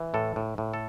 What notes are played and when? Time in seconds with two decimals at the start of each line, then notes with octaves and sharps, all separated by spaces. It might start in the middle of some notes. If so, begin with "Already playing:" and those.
Already playing: E3
0.14 A2 A4
0.36 A2
0.58 A2
0.74 A4